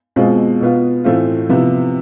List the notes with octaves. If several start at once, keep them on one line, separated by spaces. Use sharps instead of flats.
B2 G#3 C4 F4
B2 B3 F4
A2 E3 A3 C4 F4
C3 F3 B3 E4